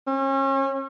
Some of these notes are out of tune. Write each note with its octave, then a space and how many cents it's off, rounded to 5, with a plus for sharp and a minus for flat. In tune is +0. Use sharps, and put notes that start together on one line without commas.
C#4 -35